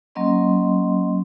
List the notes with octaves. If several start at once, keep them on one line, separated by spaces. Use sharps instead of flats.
F#3 A#3 C#4 D#5 C6